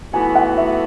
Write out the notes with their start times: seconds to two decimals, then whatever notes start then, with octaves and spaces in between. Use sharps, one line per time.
0.13 A2 E3 B3 F#4 G#5
0.35 F#5
0.58 E5